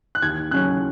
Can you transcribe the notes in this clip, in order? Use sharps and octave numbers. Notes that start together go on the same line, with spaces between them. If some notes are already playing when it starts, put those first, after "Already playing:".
F#6
D#2 G#6
C#3 F#3 C#4 F#6